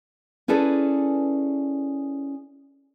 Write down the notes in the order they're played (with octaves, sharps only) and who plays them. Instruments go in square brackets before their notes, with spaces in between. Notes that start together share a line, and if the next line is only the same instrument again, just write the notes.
[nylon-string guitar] C#4 E4 G#4 A4 B4 D5